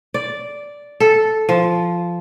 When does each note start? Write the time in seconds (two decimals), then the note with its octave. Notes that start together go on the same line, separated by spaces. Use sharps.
0.14 D5
1.00 A4
1.49 F3